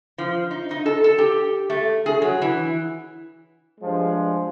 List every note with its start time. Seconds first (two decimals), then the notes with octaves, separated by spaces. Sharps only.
0.18 F3
0.51 D#4
0.71 D#4
0.86 A4
1.04 A4
1.18 G4
1.70 A3
2.06 G#4
2.22 F#3
2.42 E3
3.81 G2 F3 G#3